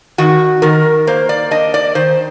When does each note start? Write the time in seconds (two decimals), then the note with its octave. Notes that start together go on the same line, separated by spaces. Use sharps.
0.18 D#3 F#4
0.62 D#3 A#4
1.07 A#3 C5
1.29 D5
1.51 D4 D#5
1.74 D5
1.95 D#3 C5